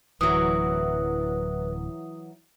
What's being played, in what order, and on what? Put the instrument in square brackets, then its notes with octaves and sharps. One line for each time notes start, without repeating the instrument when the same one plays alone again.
[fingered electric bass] D1 [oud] E3 F#3 [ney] B4 [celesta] D#6